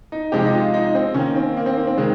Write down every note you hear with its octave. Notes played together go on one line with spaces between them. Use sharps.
D#4
C3 F3 G#3 G4
D#4
F4
D#4
C4
D#3 A#3 C#4
C4
A#3
C4
A#3
C4
D#3 G#3